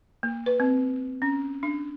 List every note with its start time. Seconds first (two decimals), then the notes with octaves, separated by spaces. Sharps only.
0.23 A#3
0.46 B4
0.60 C4
1.22 C#4
1.63 D4